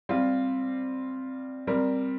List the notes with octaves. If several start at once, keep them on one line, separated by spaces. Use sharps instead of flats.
G3 C4 F4
G3 C4 A#4